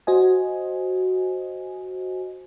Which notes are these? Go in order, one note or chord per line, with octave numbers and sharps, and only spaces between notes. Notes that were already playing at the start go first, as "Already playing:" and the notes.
F#4 C5 D#5 G#5